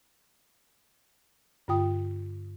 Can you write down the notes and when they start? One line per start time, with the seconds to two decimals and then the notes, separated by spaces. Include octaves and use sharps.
1.68 G2 D3 F4 G5 D#6